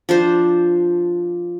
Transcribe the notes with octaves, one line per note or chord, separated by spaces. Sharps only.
F3 D4 C5